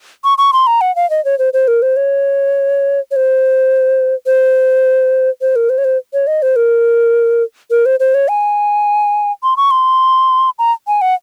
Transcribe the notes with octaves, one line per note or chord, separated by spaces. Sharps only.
C#6
C#6
C6
A#5
F#5
F5
D#5
C#5
C5
C5
A#4
C5
C#5
C#5
C5
C5
C5
A#4
C5
C#5
C5
C#5
D#5
C5
A#4
A#4
C5
C5
C#5
G#5
C6
C#6
C6
A#5
G#5
F#5